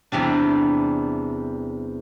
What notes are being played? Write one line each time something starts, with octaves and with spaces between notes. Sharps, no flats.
E2 C3 G3 D4